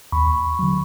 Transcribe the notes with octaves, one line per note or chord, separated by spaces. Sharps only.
D#2 B5 C#6
D3 F#3